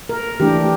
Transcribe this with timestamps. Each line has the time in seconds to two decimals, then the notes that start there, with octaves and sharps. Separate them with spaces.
0.09 A#4
0.40 E3 A3 D4 G4